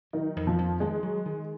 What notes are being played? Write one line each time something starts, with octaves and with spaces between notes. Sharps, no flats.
D#3 F#3
F2
F3
F2
D#3 G#3
F#3
D#3